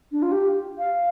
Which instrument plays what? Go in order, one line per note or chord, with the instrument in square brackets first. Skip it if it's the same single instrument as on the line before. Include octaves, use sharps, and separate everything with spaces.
[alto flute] D4
F4
G4
F5